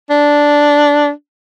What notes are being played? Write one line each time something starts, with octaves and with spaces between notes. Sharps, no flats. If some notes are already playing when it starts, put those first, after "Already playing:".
D4